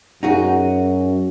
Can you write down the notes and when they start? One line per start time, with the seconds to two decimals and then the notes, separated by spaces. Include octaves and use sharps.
0.23 F#2 D#4 F#4 G#4